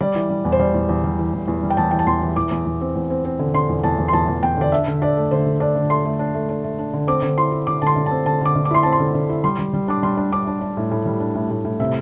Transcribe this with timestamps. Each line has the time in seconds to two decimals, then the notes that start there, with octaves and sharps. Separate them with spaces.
0.01 G3 D5
0.15 E3
0.30 G3
0.45 E2
0.52 C5
0.60 G3 D5
0.74 E2
0.89 E2
1.04 G3
1.19 E3
1.33 E2
1.48 E2
1.63 G3
1.70 G5
1.77 E2 A5
1.91 E3 G5
1.99 A5
2.07 E2 C6
2.22 E3
2.36 E2 D6
2.51 E2
2.66 E2
2.81 C4
2.96 E2
3.10 C4
3.25 C4
3.39 D3
3.54 D3 C6
3.69 E2
3.84 E2 A5
3.99 E2
4.08 C6
4.13 E2 A5
4.28 E2
4.43 E2 G5
4.57 D3 D5
4.72 D4 E5
4.87 D3
5.02 D4 D5
5.17 A3
5.31 D3 C5
5.46 D3
5.60 D4 D5
5.75 D3
5.90 A3 C6
6.05 A3
6.19 D4
6.35 A3
6.49 D4
6.64 A3
6.79 D4
6.93 D3
7.07 C4 D6
7.22 D3
7.38 E4 C6
7.52 E4
7.67 D3 D6
7.82 D3 A5 C6
7.96 D3
8.06 C4 A5
8.26 D3 A5
8.41 D3 D6
8.55 D3
8.65 D6
8.71 E4 C6
8.83 C4 A5
8.92 C6
9.00 D3
9.14 D3
9.29 E4
9.44 G3 C6
9.59 G3
9.73 G3
9.88 D4 D6
10.03 G3 C6
10.17 D4
10.32 D4 D6
10.47 D4
10.61 D4
10.77 A2
10.91 A2
11.06 G3
11.20 D4
11.35 A2
11.51 A2
11.65 A2
11.80 C3 E5